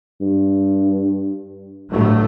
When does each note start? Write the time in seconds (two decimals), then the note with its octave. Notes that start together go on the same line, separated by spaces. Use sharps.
0.21 G2
1.90 G1 A2 F#3 A3